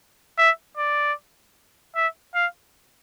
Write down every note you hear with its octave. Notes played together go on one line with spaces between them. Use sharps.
E5
D5
E5
F5